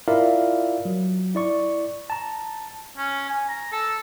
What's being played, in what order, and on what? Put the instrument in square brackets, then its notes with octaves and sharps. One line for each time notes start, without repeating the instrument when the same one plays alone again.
[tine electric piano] E4 F4 A#4 D5 E5 F5
F#3
E4 D5 C#6
A5 A#5
[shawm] C#4
G#5
A#5
A4